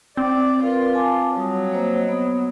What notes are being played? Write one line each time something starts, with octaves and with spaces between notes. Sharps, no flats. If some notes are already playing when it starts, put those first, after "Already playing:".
C4 D5
F4 A#4 B4
G#5 A5 D6
F#3 G3 D#6
A#3 C5 D#5
B3 D#6